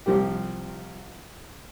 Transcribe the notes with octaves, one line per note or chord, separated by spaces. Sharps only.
C2 F3 G3 G4